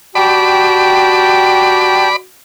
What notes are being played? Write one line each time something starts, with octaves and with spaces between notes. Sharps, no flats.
F#4 G4 D5 G5 A5 B5